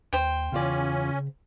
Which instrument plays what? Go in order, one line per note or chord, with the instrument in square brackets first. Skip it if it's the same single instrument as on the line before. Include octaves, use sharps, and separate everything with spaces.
[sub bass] D#2 [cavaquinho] C5 G5
[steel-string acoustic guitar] E2 F4 D5 [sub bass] C#3 [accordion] C#4